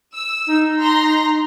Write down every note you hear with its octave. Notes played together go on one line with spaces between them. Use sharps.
E6
D#4
A#5 C6